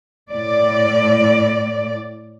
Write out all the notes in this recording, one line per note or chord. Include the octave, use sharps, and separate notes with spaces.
A2 D5